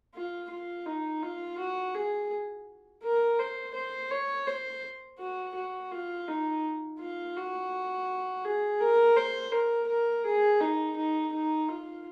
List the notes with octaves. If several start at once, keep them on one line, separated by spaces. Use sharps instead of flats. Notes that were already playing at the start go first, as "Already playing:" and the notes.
F4
F4
D#4
F4
F#4
G#4
A#4
C5
C5
C#5
C5
F#4
F#4
F4
D#4
F4
F#4
G#4
A#4
C5
A#4
A#4
G#4
D#4
D#4
D#4
F4